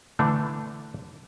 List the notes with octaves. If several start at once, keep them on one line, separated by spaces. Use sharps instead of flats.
D3 E3 A3 D4